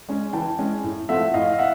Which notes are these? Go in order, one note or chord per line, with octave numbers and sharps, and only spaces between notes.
G#3 C#4
E3 G5 A5
G#3 C#4
A2
F3 A3 C4 E5 F#5
A2 D#5 F5
F5
E5 F#5